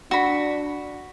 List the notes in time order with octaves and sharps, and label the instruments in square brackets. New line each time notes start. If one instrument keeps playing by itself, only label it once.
[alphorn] D4 [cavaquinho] F#4 B5